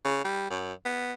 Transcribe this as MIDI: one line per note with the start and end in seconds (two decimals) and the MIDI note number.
0.05 0.20 49
0.24 0.47 55
0.50 0.73 42
0.85 1.13 59